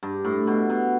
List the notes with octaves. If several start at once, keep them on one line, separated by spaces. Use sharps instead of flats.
G2
A2
B2
B2